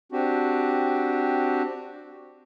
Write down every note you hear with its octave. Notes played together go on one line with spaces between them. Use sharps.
C4 D4 F#4 G4